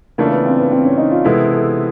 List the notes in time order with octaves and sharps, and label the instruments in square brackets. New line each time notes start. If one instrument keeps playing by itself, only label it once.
[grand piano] C#3 E3 A3 D4 F4 [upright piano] A#3
[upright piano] B3
C4
B3
C4
C#4
D#4
F4
[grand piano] C3 E3 G#3 B3 E4 [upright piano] A4
[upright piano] A4